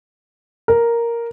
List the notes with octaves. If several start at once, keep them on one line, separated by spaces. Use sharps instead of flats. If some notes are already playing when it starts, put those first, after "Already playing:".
A#4